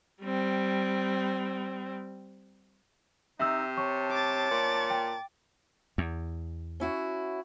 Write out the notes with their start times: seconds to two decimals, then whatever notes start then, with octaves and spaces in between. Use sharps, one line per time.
0.22 G3 C4
3.40 C3 D#4 E5 E6
3.77 C#5 A5 C#6
4.11 D6 A6
4.51 A#2
4.90 G5
5.98 E2
6.80 C#4 E4 F#4